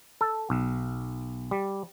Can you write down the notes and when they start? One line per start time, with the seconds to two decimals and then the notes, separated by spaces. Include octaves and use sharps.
0.21 A4
0.50 B1
1.51 G3